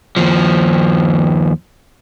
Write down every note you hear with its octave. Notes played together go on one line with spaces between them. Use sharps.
D#2 F3